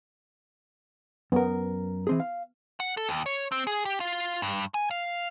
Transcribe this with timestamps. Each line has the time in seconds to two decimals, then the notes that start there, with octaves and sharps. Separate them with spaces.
1.32 F#2 B3 A#4
2.07 E3 C4 G#4
2.20 F5
2.80 F#5
2.97 A4
3.09 D#2
3.26 C#5
3.52 C4
3.67 G#4
3.85 G4
4.00 F4
4.42 G2
4.74 G#5
4.91 F5